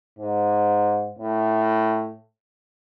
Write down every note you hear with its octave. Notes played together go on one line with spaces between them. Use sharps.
G#2
A2